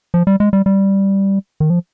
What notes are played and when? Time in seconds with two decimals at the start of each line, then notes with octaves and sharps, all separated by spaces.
0.14 F3
0.27 G3
0.40 G#3
0.53 G3
0.66 G3
1.60 D#3
1.70 F3